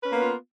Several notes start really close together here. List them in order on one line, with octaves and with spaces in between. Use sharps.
B4 C#4 A#3 B3 F4